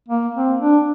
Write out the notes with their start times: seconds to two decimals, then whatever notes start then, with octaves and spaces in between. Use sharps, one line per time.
0.09 A#3
0.35 C4
0.60 D4